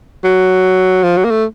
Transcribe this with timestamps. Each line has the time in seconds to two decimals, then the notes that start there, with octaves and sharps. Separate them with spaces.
0.24 F#3
1.03 F3
1.17 F#3
1.25 A#3
1.31 A3